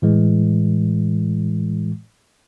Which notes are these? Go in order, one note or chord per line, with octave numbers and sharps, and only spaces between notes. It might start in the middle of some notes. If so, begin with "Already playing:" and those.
A2 E3 G#3